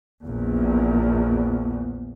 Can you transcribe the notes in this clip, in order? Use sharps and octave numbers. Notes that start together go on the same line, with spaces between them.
A#1 E2